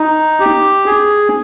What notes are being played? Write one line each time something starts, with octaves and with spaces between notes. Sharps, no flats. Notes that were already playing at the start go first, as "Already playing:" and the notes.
Already playing: D#4
G4
G#4